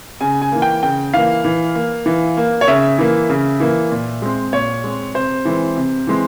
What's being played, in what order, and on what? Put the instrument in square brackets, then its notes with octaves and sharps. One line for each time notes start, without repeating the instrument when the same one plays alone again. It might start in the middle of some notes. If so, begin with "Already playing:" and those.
[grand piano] C#3 G#5
G#5
E3 A#3
G5
C#3 G5
E3 A#3 F5
E3
A#3
E3
A#3
C#5
C#3 E5
E3 A#3
C#3
E3 A#3
A#2
G#3 C4
A#2 C#5
G#3 C4
C3 C5
E3 G#3 C4
C3
E3 G#3 C4